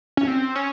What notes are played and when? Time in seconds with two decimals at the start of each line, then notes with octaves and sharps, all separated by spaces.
0.17 C#4
0.28 C4
0.56 C#4